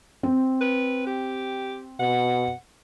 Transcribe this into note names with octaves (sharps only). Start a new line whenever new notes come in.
C4
B4
G4
B2 F#5